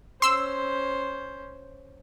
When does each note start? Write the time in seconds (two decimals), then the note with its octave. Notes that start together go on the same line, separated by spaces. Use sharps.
0.22 C#4 C5 C6 E6